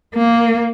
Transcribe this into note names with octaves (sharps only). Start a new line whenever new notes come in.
A#3